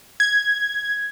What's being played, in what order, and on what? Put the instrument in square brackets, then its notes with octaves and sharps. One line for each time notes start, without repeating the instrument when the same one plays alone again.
[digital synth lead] G#6